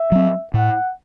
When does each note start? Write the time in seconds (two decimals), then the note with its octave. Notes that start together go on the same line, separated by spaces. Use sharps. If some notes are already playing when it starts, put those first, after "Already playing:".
Already playing: E5
0.12 F#3 C4
0.53 A2 F#5